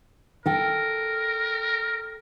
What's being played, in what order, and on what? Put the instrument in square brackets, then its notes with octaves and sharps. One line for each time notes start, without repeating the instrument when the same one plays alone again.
[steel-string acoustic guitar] A4 G5 [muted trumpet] A#4